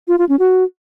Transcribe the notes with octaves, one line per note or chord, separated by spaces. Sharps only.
F4
F4
C#4
F#4